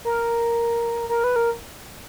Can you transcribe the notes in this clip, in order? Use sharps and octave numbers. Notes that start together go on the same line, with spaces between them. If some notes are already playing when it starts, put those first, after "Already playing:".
A#4
A#4
B4
A#4